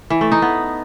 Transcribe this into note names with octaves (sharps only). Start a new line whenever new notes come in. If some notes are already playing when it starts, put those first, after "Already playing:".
E3
A3
D#4
B3